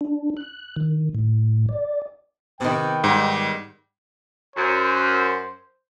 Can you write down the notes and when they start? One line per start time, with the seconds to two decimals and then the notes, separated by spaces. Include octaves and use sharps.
0.01 D4
0.37 F#6
0.76 D#3
1.15 A2
1.69 D5
2.61 C3 D#3 B3 G5
3.04 G#2 G3
4.56 F#2 C5